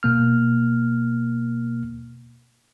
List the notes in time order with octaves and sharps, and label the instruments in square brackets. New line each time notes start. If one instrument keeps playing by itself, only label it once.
[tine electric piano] B2 A#3 F6